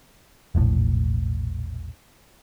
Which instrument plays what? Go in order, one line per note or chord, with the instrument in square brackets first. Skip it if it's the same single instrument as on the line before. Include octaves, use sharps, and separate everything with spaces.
[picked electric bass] E1 A#1 A2